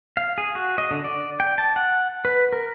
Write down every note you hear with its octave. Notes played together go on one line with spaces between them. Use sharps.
F5
G#4
F#4
D#5
D3
D5
G5
A5
F#5
B4
A#4